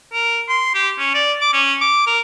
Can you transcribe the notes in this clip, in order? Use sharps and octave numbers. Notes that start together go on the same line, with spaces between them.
A#4
C6
G4
C#4
D5
D6
C#4
D6
A#4